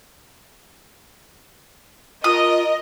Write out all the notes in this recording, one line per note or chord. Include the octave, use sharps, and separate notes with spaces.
F4 A#4 D#5 D#6